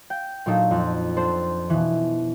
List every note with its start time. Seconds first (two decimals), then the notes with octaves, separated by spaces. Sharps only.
0.10 G5
0.46 A#2 F#3 A#3 D4 D#4 A4
0.71 F2
1.17 D4 A4 C5
1.70 B2 E3